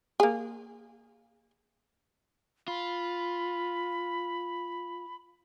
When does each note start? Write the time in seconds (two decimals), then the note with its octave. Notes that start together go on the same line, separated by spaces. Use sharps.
0.20 A#3 G#4
2.68 F4 B5